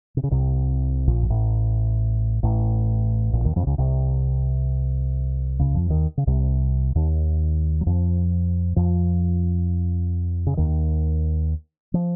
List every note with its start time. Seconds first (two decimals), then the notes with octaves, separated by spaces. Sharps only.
0.17 C3
0.24 C#3
0.31 C2 C3
1.07 A#1 A#2
1.23 F#2
1.30 A1 A2
2.43 A1 A2
3.33 A#1 A#2
3.44 D#2 D#3
3.56 F2 F3
3.63 C3
3.67 C#2 C#3
3.78 C2 C3
5.59 C#2 C#3
5.74 F2 F3
5.90 D#2 D#3
6.18 C#3
6.27 C2 C3
6.95 D#2 D#3
7.81 F#3
7.87 F2 F3
8.76 F2 F3
10.47 C#3
10.57 D#2 D#3
11.94 F3